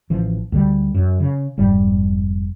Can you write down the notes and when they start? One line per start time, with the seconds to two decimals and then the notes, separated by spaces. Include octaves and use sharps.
0.10 A1 E3 F3
0.52 D2 D3 G3
0.95 F#2
1.20 C#3
1.58 F1 G#2 G3